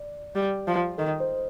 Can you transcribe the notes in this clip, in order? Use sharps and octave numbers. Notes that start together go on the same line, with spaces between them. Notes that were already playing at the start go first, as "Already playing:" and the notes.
Already playing: D5
G3
F3
D#3 A4
C5